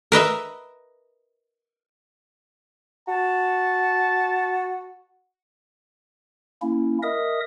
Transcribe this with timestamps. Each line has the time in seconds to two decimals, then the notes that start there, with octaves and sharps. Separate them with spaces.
0.12 A#4 B4 D#5 E5
3.08 F#4 A5
6.62 A#3 C#4 E4
7.03 A#4 D#5 E5 D#6